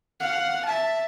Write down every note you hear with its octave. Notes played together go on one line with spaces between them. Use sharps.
F5 F#5
E5 A5